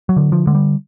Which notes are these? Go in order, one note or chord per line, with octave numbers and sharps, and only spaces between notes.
F#3
D3
F3
D3 G#3
G3